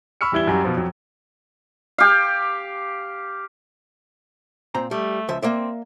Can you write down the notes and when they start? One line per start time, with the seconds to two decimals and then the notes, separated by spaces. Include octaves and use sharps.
0.21 B5 C#6 E6 F6 C#7
0.32 E2 G3 E4 G#6 G7
0.47 F#2 G3 F#4 G4 A#5
0.64 B2 F3
0.77 F2 F#3
1.98 G4 F5
4.75 A#2 C4 A#5
4.91 G3 A3
5.28 C#2 F3 E5
5.42 A#3 C4 D5 E5